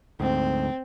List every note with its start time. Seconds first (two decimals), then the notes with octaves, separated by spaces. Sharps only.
0.20 D2 G#2 C4